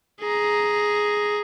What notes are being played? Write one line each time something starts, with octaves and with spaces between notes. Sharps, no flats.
G#4 A#5